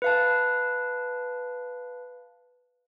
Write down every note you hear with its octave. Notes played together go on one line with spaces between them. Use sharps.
B4 F5 A5